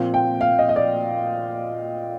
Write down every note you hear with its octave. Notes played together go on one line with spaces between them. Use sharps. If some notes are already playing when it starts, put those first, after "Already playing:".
Already playing: A#2 F3 C4
G5
F5
D#5
D#5
D5